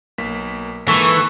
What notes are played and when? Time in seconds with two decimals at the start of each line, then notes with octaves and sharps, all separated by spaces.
0.18 B1 A#3 B6
0.88 G#2 E3 A#3 A4 C#6